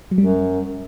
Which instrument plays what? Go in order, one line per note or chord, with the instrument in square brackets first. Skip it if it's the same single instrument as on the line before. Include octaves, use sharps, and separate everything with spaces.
[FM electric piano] F#3
[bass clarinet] F#2 [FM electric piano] G3